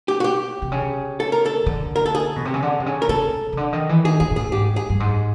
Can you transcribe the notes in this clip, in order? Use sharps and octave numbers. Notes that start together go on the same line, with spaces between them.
G4
F#4
G4
C3
C#3
A4
A#4
A4
D3
A#4
A4
G#4
B2
C3
C#3
D3
C3
C#3
A#4
C#3 A4
C#3
D3
D#3
E3
D#3 G#4
D#3 G#4
A#2
A2 G#4
G#2 G4
G#4
G2
G#2